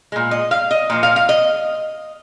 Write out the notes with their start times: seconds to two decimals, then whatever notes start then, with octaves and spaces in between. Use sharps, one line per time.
0.12 A#2 G#3
0.31 D#5
0.51 F5
0.71 D#5
0.90 A#2 F3 A#3
1.03 F5
1.16 F5
1.29 D#5